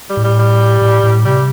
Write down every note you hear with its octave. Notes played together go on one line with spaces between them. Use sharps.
G3
A2
G3
G3
A2
A2
C3 G3